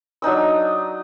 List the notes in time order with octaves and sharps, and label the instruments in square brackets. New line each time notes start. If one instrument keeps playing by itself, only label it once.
[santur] F#3 D4 D#4 E6